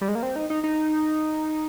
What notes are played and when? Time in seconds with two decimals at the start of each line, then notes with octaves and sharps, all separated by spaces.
0.01 G3
0.08 G#3
0.15 A#3
0.23 C4
0.36 D#4
0.50 D#4
0.64 D#4